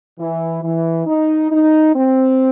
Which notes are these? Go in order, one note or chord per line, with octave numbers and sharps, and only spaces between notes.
E3
E3
D#4
D#4
C4